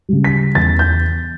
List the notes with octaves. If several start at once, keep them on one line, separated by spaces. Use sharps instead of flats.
C#3 G3
B6
E2 A6
G6